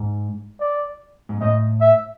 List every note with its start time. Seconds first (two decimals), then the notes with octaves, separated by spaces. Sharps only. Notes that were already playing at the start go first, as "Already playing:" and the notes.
Already playing: G#2
0.60 D5
1.29 G#2
1.41 A2 D#5
1.81 E5